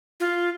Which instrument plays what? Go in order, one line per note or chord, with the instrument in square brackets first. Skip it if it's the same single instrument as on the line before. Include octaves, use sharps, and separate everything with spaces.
[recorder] F4